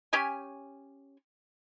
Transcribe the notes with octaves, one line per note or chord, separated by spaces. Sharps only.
C#4 G4 C#5 G#5